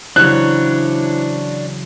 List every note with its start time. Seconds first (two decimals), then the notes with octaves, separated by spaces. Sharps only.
0.16 C#3 E3 F#3 D4 E4 C5 C#5 F#6